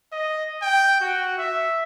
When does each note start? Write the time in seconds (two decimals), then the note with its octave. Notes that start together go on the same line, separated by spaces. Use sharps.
0.12 D#5
0.62 G5
1.01 F#4
1.38 E5